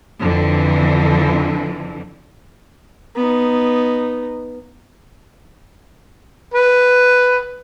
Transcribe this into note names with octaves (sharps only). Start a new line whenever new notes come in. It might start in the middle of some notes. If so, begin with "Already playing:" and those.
F2 D3 E3
B3 D#4
B4